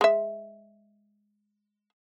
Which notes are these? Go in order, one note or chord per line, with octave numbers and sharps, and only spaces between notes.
G#3 E5